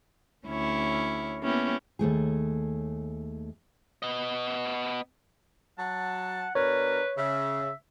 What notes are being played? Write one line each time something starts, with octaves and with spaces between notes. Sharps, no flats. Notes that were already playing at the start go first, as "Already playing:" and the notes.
D2 C#4 E4 C#5
A#3 B3 C#4 E4 G4
D#2 G#2 A3 G#4
B3 D#5
F#3 F#5 A5
B2 D4 A#4 B4 C#5
C#3 E5